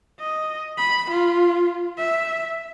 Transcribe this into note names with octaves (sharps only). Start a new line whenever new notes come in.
D#5
B5
F4
E5